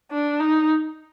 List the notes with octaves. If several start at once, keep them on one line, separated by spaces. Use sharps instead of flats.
D4
D#4